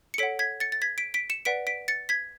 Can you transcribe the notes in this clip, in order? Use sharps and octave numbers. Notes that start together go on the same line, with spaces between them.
C#7
A4 C#5 F#5 B6 D7
G#6 B6
A6 C#7
A6
G#6 B6
B6 D7
B6 D7
C#7 E7
B4 D5 F#5 B6 D7
B6 D7
A6 C#7
G#6 B6